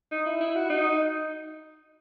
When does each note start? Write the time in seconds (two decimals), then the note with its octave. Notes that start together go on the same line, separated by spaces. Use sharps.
0.11 D#4
0.26 E4
0.41 E4
0.56 F#4
0.70 D#4